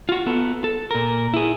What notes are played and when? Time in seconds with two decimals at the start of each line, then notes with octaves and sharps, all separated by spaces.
0.09 F4 F#4
0.26 B3 A4
0.64 A4
0.91 A#2 A#4
1.34 E4 G#4